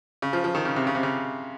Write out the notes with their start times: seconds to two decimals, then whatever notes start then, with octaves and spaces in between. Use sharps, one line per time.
0.22 C#3
0.33 F3
0.44 F3
0.55 D#3
0.65 C#3
0.76 C3
0.87 C#3
0.95 C3
1.03 C#3